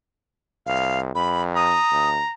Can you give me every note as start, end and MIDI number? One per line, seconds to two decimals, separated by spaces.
0.66 1.11 36
0.66 0.99 77
1.15 1.77 41
1.15 1.42 83
1.56 2.34 82
1.56 2.09 87
1.92 2.20 38